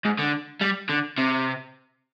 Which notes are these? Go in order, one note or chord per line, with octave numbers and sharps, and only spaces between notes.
G#2
D3
G3
D3
C3